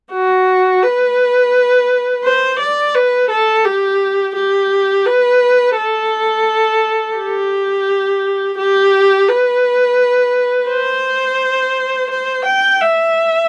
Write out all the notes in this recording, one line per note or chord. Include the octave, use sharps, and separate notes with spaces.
F#4
B4
C5
D5
B4
A4
G4
G4
B4
A4
G4
G4
B4
C5
C5
G5
E5